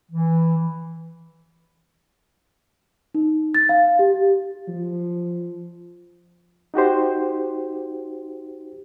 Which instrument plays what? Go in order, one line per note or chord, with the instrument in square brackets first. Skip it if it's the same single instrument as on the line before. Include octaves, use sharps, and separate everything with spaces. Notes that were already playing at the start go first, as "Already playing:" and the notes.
[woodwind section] E3
[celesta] D#4
A6
F5
G4
[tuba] F3
[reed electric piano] D#4 F#4 G4 C5